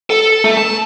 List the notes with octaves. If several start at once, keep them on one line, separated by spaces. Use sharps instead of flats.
A4
A3
A5